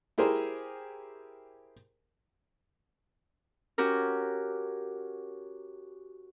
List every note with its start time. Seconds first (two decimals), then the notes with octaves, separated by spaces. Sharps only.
0.18 E4 G4 G#4 A#4 C5
3.78 C#4 F#4 G4 A#4